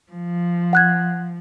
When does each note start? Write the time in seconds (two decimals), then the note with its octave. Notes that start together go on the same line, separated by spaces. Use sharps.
0.12 F3
0.73 F#5 F#6 G#6